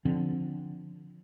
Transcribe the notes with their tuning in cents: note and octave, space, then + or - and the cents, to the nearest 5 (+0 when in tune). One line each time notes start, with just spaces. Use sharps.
D3 +0 F3 +5 C4 +0